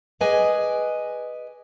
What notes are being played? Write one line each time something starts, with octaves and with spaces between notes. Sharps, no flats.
G#4 B4 D5 D#5 G#5